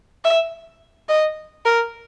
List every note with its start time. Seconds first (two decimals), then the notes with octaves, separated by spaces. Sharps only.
0.25 E5
1.09 D#5
1.65 A#4